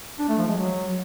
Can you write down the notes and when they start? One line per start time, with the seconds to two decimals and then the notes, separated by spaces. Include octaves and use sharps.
0.19 D4
0.29 A3
0.38 F3
0.48 G#3
0.57 F#3